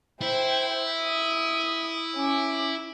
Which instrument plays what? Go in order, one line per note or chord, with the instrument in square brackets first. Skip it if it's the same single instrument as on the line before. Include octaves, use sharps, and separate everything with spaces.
[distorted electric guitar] E4 [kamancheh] C5 G5
[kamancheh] D#6
C#4 D6